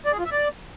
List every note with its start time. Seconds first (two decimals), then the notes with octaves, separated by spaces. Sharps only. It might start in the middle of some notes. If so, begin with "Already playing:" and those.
0.06 D5
0.12 G#4
0.19 F4
0.25 E5
0.32 D5